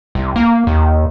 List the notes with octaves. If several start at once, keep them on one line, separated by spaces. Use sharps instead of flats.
C2
A#3
D#2